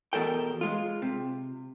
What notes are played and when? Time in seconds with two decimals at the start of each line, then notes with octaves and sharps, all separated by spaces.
0.13 E2 B2 F#3 A4 A#4 G5
0.61 G#3 F4
1.02 C3